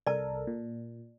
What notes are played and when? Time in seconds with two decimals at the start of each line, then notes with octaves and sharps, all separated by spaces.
0.07 C2 A4 A#4 D5 A5
0.47 A#2